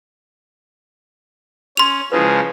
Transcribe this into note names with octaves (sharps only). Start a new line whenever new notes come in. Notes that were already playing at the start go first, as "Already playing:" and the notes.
C#4 C6 F7
C#3 F3 G#3 E4 F4 B4